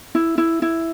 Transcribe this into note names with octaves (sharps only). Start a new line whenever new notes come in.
E4
E4
E4